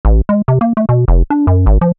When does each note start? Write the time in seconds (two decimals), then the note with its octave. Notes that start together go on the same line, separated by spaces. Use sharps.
0.05 A1
0.29 G#3
0.48 C3
0.61 A#3
0.77 A3
0.89 B2
1.08 F1
1.30 D4
1.47 F#2
1.66 G#1
1.81 F3